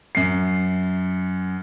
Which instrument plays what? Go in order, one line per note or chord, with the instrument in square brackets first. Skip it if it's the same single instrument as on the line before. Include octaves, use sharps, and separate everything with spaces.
[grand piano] F#2 C7